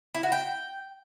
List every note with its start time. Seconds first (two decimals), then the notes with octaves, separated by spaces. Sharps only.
0.15 E4
0.23 F#4
0.32 G5